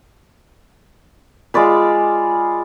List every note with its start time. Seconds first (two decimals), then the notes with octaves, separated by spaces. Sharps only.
1.54 G#3 F4 D5 B5